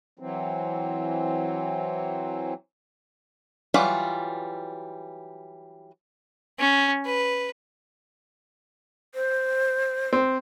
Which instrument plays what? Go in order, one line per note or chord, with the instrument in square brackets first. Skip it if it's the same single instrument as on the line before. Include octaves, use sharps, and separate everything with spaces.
[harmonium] E3 F#3 C4
[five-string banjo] E3 F#3 G3 F4 B5
[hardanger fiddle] C#4
B4
[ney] C5
[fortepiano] C4